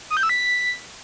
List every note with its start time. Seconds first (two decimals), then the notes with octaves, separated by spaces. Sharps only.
0.10 D#6
0.17 G6
0.23 E6
0.29 B6